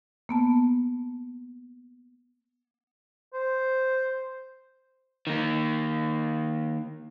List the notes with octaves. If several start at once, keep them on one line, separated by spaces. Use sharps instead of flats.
A#3 B3 A5
C5
D#3 A#3